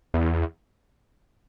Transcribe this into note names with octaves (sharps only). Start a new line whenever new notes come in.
E2